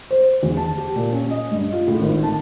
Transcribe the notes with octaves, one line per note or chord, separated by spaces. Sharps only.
C5
E2
A5
G4
A#2
C#4
D#5
G2
F4
A2
G#1
A5